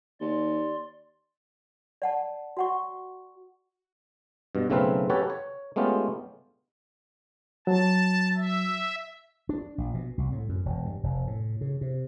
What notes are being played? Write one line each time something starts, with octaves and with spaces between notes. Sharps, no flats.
D#2 D5 C6
D5 F#5 A5
F#4 F#5 C#6
G2 B2
B1 C#3 A3 C4 B4 F5
C#4 F#4 G4 A4 B4 C#5
C#5
G#3 A3 B3 C#4 F4 G4
F#3 A5
E5
D4
A#1
B2
C2
A2
F#2
E1
G2
F1
A2
C#3
C3